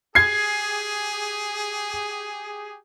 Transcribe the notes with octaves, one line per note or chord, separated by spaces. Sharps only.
G4 G#4 G#6 C7